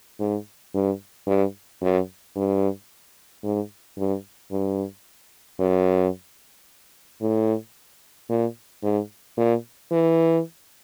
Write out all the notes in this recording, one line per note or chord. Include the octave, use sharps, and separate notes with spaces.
G#2
G2
G2
F#2
G2
G#2
G2
G2
F#2
A2
A#2
G#2
A#2
E3